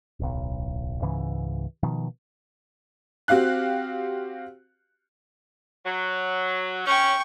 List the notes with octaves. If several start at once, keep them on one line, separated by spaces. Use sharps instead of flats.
D1 B1
C#2 G#2 C#3 E3
B2 D#3 F3
C4 F#4 G4 F5 F#6
F#3
C#4 G5 C#6